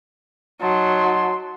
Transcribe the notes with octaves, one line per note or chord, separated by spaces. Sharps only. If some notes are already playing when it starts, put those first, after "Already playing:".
F#3 D#4 A5 C6